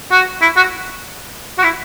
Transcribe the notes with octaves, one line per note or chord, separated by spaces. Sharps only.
F#4
E4
F#4
F#4
E4